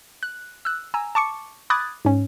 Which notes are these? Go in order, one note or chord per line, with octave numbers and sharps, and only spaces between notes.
F#6
E6 F#6
G#5 A#5 E6
A5 C#6 D6 C#7
B5 D6 D#6 F#6 G#6 A6
G#2 C#4